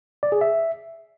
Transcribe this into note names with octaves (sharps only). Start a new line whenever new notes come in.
D5
G#4
E5